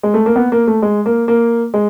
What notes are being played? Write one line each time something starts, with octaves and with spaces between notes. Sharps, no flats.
G#3
A3
A#3
B3
A#3
A3
G#3
A#3
A#3
G#3